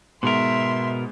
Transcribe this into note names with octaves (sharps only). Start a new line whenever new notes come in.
G#2 B2 G#3 B3 A#4 E5 C6